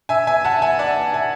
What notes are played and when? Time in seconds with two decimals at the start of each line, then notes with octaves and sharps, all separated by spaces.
0.09 E5 G#5
0.27 E5 G#5
0.45 F#5 A5
0.62 E5 G#5
0.79 D5 F#5
1.14 E5 G#5